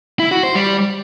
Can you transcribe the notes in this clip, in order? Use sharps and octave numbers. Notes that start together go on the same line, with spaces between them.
E4
F#4
C5
G3